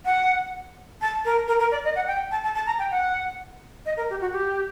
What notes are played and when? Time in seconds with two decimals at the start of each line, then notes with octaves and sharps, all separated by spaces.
0.05 F#5
1.01 A5
1.25 A#4
1.48 A#4
1.59 A#4
1.71 D5
1.84 D#5
1.95 F#5
2.07 G5
2.31 A5
2.44 A5
2.55 A5
2.66 A#5
2.79 G5
2.91 F#5
3.86 D#5
3.97 A#4
4.10 G4
4.21 F#4
4.33 G4